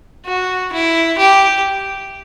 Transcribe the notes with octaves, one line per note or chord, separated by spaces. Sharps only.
F#4
E4
G4